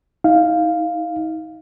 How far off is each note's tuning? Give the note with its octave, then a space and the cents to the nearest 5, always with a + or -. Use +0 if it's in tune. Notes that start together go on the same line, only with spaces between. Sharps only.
D#4 +40 F5 +0